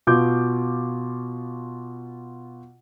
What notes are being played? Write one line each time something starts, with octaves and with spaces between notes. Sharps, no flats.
B2 F4 D6 G6